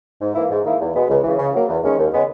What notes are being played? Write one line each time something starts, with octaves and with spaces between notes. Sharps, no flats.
G#2
E3 A#3 E4
G#2
D#3 A#3 E4
E2
B2 G#3 B3
C#2
C#3 E3
C#3
F#3 A#3
E2
D#3 G#3 C#4
D#2
C#3 G#3 B3